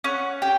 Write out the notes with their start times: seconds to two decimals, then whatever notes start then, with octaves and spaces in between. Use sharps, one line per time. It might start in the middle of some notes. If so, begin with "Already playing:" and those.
0.04 C#4 F#5
0.42 G4 G5